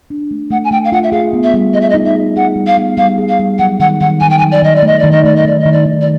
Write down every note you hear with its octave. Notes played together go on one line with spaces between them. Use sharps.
D4
A3
A3 F#5
G#5
A3 G5
F5
F4 F#5
E5
G#4 F5
B3
E5
G3
G#4 D#5
E5
D#5
D#4
E5
G#4
G#4 F#5
G3
F5
B3
G3 F5
G#4
F5
G3
F#3 F#5
D#3 F#5
D#3 F#5
D#3 G#5
G5
G#5
F#3
D5
D#3 D#5
D5
A3 D#5
D#3 D5
D#5
A3 D5
D#5
D#3 D5
D#5
D#3
D5
D#3
D5